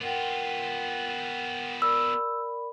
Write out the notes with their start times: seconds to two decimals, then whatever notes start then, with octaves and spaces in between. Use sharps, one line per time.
0.01 B3 F4 A#4 F#5 G5
1.82 A#4 D5 B5 E6